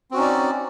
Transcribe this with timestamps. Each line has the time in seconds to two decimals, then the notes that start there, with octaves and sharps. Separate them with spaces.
0.11 C4
0.14 F#4
0.16 C#4
0.19 D#4
0.22 D5